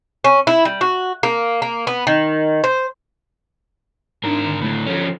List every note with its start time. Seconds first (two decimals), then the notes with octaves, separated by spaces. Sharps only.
0.24 C#4
0.47 E4
0.65 G3
0.81 F#4
1.23 A#3
1.62 A#3
1.87 B3
2.07 D#3
2.64 C5
4.24 G#2 D4 D#4 A#4 A#5
4.44 D3 D#3
4.62 A2 D3 B5
4.87 F3 C#4 A4